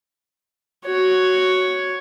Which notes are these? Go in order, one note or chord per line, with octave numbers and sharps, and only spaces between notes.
F#4 C#5